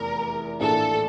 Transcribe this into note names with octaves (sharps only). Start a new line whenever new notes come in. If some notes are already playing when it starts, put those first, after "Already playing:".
Already playing: F1 E2 E3 A#4
A#1 A2 E3 A#3 D4 A4